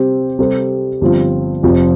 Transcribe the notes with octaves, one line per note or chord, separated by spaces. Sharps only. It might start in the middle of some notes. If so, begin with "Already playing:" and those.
Already playing: C3 G3 C4 G4
C3 G3 C4 A4 C5
G1 G2 F3 C4 F4
F1 F2 F3 C4